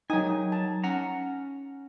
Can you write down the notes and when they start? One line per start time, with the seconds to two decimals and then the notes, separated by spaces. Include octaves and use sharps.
0.10 F#3 D#4 G5 G#5 D#6
0.52 A5
0.84 C#4 F#5 A#5